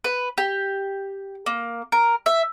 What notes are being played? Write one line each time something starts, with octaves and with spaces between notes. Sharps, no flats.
B4
G4
A#3
A#4
E5